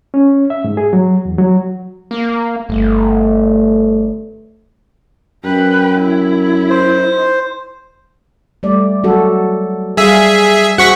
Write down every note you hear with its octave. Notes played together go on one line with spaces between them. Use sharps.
C#4
E5
G#2
G#4
F#3
E2
F#3
A#3
G1 A3
F#2 B4 G5
E4
C5
G3 A3 D5
F#3 F#4 A4
G3 G#4 E5 F5
F#4 G#4 C5 F#5 C#6 B6